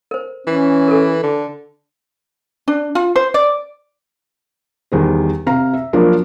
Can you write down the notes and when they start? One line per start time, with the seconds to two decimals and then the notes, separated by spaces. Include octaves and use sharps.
0.11 A#4 C5
0.47 E3 C#4
0.88 A4 A#4
1.23 D3
2.68 D4
2.95 F4
3.16 C5
3.34 D5
4.92 E2 D#3 G3 C5
5.46 C3 F5 A#5
5.73 E5
5.93 F3 F#3 A#3 D4 F4 A#4